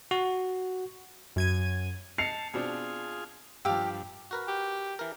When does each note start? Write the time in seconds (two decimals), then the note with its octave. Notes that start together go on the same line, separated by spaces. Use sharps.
0.11 F#4
1.36 F#2 G#6 D#7
2.18 D#5 A5 C7 C#7 F7
2.54 B2 C4 D4 F4 G#4
3.65 G2 F3 G4 F5 E6
4.31 F#4 A#4 B4
4.48 G4
4.99 E3 A#4